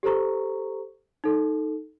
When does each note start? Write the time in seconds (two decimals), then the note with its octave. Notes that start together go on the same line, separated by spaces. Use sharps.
0.03 G4 A4 C5 A#5 C#6
1.24 D#4 A4